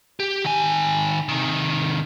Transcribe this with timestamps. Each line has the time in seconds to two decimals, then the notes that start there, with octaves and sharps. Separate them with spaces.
0.20 G4
0.44 D#3 G#5
1.29 C3 D#3